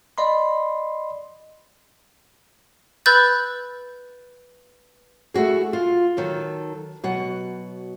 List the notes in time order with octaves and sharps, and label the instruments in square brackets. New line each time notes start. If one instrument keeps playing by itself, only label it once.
[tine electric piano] D5 D#5 B5 C6
[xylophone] B4 B5 E6 F#6 G6 A6
[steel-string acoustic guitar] A3 E4 F#4 G#4
F4
D#3 F#3 A4
B2 F#3 F#5